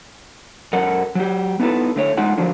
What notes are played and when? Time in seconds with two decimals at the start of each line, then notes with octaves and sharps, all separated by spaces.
0.73 F#2 F#3 A4 A#4 D#5 F#5
1.15 F#3 G4
1.60 B3 D#4 E4 F#4 A4 B4
1.96 D3 A3 C#5
2.17 G#3 A3 D#4 F4 F#5
2.38 D3 F3 F#3 D4